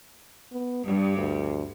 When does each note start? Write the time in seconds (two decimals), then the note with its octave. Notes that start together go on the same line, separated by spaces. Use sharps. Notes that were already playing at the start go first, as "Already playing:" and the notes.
0.52 B3
0.85 G2 G3
1.17 D2